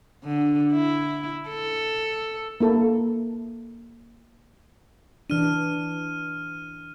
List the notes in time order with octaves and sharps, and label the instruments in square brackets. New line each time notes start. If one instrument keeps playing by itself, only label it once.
[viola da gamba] D3
E4
A4
[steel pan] A#3 E4 A4
[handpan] E3 D4 [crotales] F6 D#7